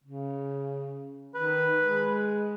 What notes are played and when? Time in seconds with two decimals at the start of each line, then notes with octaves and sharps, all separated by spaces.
0.04 C#3
1.35 D#3 B4
1.80 G#3